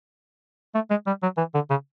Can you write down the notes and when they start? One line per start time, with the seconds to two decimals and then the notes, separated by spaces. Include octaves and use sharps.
0.74 A3
0.90 G#3
1.06 G3
1.22 F#3
1.37 E3
1.54 D3
1.70 C#3